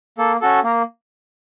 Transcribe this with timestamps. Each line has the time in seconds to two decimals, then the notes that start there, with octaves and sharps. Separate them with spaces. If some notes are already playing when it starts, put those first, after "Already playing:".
0.18 A#3 A4
0.41 C#4 F#4 A4
0.64 A#3 A#4